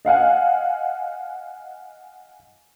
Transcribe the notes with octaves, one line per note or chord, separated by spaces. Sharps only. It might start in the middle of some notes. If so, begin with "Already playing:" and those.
D#5 F5 F#5 G#5